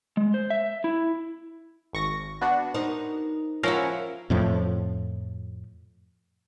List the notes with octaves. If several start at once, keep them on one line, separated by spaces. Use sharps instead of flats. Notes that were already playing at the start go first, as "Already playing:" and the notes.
G#3
C5
E5
E4
G#1 C#6 A#6
B3 D4 F#4
D#4 A#4 C5
F3 C#4 E4 F#4 A#4 F5
F2 A2 F3